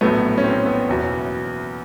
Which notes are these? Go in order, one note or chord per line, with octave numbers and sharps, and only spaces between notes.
A#1 A2 F#3 A3 B3
C#4
C4
B3
F#1 E2 B2